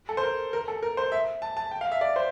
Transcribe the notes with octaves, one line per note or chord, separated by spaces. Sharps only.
A4
C5
A#4
A#4
A4
A#4
C5
E5
A5
A5
G5
F5
E5
D5
C5